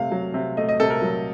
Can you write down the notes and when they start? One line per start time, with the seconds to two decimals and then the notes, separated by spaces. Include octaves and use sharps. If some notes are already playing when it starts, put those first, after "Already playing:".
Already playing: C3 A3 F5
0.11 F#3
0.34 C3
0.57 A3 D#5
0.69 D#5
0.80 C3 A4
0.90 A#4
1.02 F#3